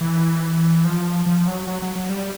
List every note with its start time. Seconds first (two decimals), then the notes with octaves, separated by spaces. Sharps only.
0.01 E3
0.85 F3
1.26 F3
1.47 F#3
1.67 F#3
1.82 F#3
1.96 F#3
2.09 G3